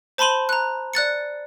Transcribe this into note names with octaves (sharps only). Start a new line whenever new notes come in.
C5 A5 B5 C6 D#7 F#7
A#5 F#6
D5 F#6 A6 C#7